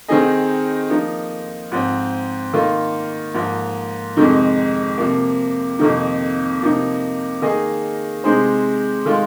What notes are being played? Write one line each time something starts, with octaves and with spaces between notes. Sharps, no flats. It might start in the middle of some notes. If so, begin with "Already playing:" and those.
D#3 C4 D#4 G#4 D#5
F3 A#3 D#4
G#2 F3 C4
D#3 A#3 F4
G#2 F3 A#3
F2 C3 D#3 G#3 D#4
C3 F3 A#3
F2 C3 D#3 A#3 D#4
C3 F3 A#3 D#4
D#3 A#3 G#4 D#5
C3 G#3 D#4 G#4 C5
D#3 G#3 F4